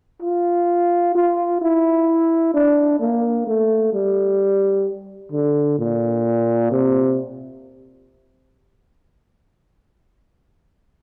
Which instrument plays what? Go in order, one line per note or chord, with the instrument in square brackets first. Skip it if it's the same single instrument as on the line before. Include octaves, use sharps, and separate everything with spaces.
[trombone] F4
F4
E4
D4
A#3
A3
G3
D3
A#2
C3